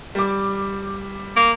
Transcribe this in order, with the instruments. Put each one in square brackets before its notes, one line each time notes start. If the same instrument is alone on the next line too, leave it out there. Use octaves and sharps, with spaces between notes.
[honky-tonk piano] G3 D6
[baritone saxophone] A#3